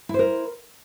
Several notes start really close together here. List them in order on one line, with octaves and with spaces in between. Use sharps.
E4 C5 A#4